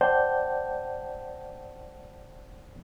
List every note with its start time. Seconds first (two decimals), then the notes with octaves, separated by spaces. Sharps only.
0.01 C5 D5 F#5 G5 A5 G6